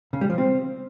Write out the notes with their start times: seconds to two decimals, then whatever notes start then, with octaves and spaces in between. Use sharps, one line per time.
0.13 C#3
0.21 G3
0.30 F3
0.38 C4